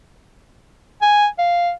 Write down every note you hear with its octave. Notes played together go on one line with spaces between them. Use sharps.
G#5
F5